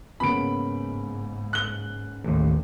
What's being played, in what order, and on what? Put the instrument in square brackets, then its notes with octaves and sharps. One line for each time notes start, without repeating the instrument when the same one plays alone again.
[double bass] G#2 [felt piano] C#3 A#3 B3 [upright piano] B5 D7
[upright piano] F#6 G7
[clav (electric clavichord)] A1 D#2